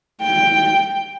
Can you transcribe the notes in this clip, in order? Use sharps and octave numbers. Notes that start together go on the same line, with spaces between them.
G5